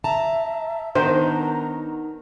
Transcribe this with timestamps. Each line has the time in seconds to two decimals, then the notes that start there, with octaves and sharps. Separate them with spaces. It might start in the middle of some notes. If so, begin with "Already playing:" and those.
0.04 E5 A5 A#5
0.95 D#3 B3 D4 A#4 C5 A#5